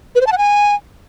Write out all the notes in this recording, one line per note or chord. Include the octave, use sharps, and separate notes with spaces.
B4
C5
A5
F#5
G#5